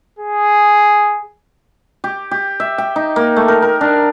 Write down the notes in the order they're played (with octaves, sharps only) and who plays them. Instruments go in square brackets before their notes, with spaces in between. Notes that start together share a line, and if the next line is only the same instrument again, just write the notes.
[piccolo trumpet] G#4
[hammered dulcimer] G4
G4
E5
G5
D#4
A#3
A3
A#4
A#4
D4